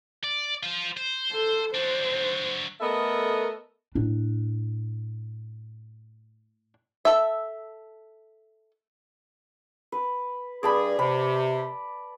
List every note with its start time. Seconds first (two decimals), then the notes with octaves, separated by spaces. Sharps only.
0.24 D5
0.63 F4 C5
0.97 C5
1.32 A4
1.75 F#3 D4 C5
2.81 A3 B3 A4 A#4 D#5 E5
3.95 A2 D4
7.05 A4 E5
9.92 B4
10.63 G2 G#4 D5 A5 B5
10.99 C3 B5